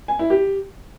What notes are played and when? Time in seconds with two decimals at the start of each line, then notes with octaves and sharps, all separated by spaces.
0.08 G#5
0.19 E4
0.30 G4